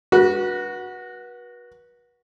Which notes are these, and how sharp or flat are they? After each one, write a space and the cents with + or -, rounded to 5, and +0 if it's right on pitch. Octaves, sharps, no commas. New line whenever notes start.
F#4 +0 B4 -35